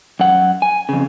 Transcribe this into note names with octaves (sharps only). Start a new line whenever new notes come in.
F#2 F#5
G#5
F2 C#3